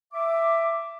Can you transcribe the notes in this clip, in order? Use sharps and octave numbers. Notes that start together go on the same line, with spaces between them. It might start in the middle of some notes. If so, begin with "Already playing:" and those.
E5 D6